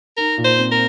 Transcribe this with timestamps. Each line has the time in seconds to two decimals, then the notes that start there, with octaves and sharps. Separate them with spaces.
0.17 D#4 A#4
0.38 A#2
0.45 C5
0.58 C4
0.72 A#4